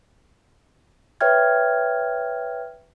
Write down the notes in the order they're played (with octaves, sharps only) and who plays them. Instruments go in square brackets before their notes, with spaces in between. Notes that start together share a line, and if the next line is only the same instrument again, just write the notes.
[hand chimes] B4 C#5 E5 G5 F6 G#6